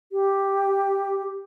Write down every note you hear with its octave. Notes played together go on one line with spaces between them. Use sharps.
G4